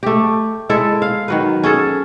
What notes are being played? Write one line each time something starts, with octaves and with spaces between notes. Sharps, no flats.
A3 G4
G#3 E4 A4
F5
D#3 F#3 B4
C#4 G#4 A4